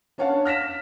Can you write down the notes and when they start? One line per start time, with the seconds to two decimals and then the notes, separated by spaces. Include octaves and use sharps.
0.18 C#4 D4 C#5 F5 F#5 A5
0.45 F6 A#6 B6 E7